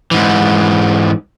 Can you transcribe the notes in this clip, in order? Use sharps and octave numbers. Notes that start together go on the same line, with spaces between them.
G#2 E3